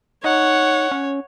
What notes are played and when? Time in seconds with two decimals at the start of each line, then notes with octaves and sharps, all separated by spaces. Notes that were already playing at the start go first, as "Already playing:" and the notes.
0.24 D#4 C#5 F#5
0.92 C#4